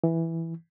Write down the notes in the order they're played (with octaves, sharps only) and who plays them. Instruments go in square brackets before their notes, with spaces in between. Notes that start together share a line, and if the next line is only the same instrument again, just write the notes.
[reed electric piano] E3